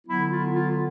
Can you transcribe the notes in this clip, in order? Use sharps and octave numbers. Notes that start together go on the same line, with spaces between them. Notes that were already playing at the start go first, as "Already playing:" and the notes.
D3 F#3 B3 E4
F4
F4